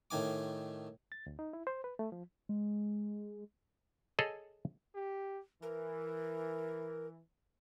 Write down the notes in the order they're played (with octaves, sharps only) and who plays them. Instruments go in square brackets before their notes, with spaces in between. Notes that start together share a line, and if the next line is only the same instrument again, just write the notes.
[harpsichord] A2 D#3 G#5 D6
[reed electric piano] A6
D2
D#4
E4
C5
B4
A3
F3
[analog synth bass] G#3
[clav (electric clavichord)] G#4 A4 C#5 D#5
[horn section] G4
[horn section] E3 [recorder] A#4